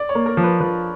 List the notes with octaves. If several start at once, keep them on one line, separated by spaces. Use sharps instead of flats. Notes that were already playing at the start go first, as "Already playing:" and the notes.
Already playing: D5
C#5
A#3
A#4
F3
B4
F3 B4